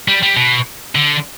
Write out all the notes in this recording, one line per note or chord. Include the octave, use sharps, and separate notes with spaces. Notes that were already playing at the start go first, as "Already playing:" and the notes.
G3
G3
B2
D3